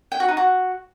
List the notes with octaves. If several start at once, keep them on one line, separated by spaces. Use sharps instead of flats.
G5
F#4
D#4
F#4